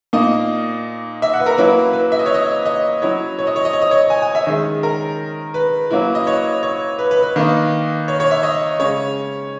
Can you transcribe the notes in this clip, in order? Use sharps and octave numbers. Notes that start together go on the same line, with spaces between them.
A#2 A#3 D#4 D#5
E5
F#5
B4
A#4
F#3 A#3 C#4 E4 B4
B4
E5
D#5
C#5
D#5
D#5
F#3 C#4 E4 C#5
C#5
D#5
C#5
D#5
C#5
D#5
C#5
G#5
G#5
E5
D#3 G#3 C#4
A#4
B4
F#3 A#3 C#4 E4
D#5
C#5
C#5
B4
B4
B4
D#3 A#3 D#4
C#5
C#5
E5
D#5
C#3 G#3 C#4 C#5